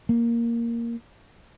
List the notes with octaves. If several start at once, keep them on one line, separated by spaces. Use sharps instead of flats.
A#3